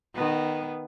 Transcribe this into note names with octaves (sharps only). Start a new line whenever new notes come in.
D#3 B3